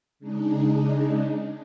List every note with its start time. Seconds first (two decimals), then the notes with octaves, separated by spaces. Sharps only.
0.19 C#3 G#3 D4 D#4